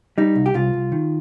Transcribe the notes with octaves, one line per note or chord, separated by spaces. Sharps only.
G3 D#4
C2
G4
C2 F4
C2
D#3